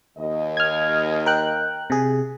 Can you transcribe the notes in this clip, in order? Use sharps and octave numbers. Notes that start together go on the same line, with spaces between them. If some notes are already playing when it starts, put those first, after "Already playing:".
D#2 D#5
F6 G#6
A#4 G5 F#6
C3 G#4